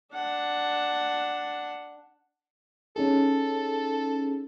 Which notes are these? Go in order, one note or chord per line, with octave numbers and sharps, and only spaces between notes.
D4 F#5
C#4 D#4 G#4 A4